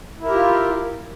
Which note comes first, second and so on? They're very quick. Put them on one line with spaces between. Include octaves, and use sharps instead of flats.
E4 A#4 G4 F4